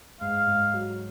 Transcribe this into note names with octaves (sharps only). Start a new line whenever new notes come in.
G#2 F5
G#2
F#3